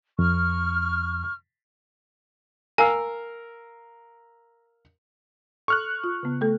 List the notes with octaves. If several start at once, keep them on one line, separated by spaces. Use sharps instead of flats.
F2 C#6 F6
A#4 F5 G#5 E6
A4 C#6 F6 F#6
F4
C#3 B3
A3 A4